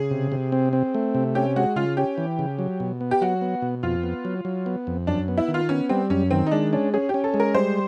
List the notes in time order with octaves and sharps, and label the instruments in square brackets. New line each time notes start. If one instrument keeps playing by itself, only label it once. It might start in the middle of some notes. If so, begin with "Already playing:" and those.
Already playing: [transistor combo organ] C#3 [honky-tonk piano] G#4
[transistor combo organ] C3
C3
C4
C4
A3
C3
[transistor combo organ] C#4 [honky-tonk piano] G4
[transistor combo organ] G#3 [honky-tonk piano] F#4
[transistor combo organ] C#3 [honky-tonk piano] F4
[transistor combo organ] C#4 [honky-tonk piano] G4
[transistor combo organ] E3
C#3
F#3
B2
B3
[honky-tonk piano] G4
[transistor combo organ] F#3 [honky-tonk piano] F#4
[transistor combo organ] B3
B2
[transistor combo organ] F2 [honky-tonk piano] F4
[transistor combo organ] B3
F#3
F#3
B3
F2
[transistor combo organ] F#2 [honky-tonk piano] D4
[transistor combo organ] B3
[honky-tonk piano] E4
[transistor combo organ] D#3
[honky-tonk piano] F4
[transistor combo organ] B3 [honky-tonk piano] C#4
[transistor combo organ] G3 [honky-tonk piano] C4
[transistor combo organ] F#2 [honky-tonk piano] C#4
[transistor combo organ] D#3 [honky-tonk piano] C4
[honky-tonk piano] D#4
[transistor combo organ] G#3 [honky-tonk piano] D4
[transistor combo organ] C#4 [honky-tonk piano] D4
[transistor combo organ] C#4 [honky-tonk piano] G#4
[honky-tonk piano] G4
[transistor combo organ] C#4
[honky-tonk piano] A4
[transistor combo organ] G#3
[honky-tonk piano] A#4
[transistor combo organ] G3 [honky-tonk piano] C5